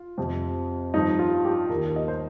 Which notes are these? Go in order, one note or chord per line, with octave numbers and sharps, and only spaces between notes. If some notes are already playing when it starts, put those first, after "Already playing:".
Already playing: F4
F2 C3 F3
G2 F3 D#4
F4
G4
D#2 D#3 A#4
D#5
C5